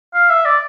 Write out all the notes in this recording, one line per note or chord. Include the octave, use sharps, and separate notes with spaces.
F5
E5
D5